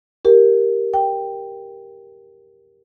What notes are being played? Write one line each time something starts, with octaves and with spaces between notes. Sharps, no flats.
G4 A#4
G5